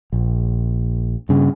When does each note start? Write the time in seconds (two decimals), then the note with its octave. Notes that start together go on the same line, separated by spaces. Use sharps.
0.13 A#1
1.29 G2 C#3